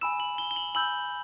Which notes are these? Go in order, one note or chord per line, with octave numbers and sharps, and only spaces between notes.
G#5 B5 E6 E7
F#7
G7
G7
F#7
G#5 B5 E6 G6 F#7